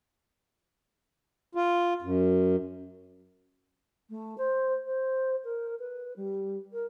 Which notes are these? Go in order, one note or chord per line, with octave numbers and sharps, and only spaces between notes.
F4
F#2
A3
C5
C5
A#4
B4
G3
A#4